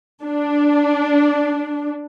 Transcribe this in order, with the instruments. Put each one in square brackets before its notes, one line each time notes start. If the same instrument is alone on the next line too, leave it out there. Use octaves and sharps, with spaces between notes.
[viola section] D4